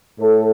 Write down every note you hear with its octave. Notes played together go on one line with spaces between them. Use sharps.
A2 A4